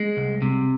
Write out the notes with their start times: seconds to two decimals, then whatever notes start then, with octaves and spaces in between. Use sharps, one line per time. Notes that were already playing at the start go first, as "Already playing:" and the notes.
Already playing: G#3
0.17 C2
0.42 C3